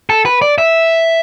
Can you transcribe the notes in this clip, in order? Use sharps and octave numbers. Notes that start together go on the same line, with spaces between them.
A4
B4
D5
E5